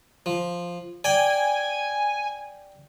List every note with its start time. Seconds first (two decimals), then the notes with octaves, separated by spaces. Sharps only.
0.26 F3
1.04 D5 G5 G#5